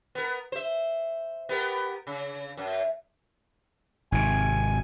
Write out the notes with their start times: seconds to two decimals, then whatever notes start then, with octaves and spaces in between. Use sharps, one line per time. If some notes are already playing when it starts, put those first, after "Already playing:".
0.15 B3 A#4
0.52 C5 E5
1.49 B3 G4 A#4
2.07 C#3
2.57 F#2
4.12 G#1 C3 G#5